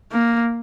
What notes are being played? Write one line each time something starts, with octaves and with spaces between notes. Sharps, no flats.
A#3